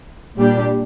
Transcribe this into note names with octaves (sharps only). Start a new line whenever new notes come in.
A#2 G3 D4 G4